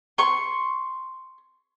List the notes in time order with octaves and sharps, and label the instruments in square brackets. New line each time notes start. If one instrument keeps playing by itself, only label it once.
[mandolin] C6 C#6